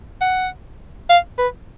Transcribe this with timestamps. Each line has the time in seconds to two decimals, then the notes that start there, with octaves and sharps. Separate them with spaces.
0.21 F#5
1.10 F5
1.38 B4